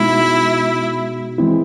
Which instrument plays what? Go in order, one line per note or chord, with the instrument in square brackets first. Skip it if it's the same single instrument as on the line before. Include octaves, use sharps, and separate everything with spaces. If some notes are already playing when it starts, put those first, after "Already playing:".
Already playing: [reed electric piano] B2 G#3 B3 D#4 F#4 [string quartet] E4
[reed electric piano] E3 G#3 C4 E4